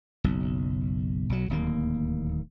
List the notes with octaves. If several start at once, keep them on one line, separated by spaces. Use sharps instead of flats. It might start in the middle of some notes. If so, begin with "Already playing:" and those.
F#1 B1
B1 F#3
D1 D#2 A#3